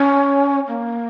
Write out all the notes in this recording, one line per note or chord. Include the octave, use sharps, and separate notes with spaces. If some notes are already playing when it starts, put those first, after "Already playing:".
Already playing: C#4
A#3